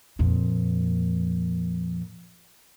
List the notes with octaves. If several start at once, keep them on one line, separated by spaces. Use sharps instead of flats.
F2 A#2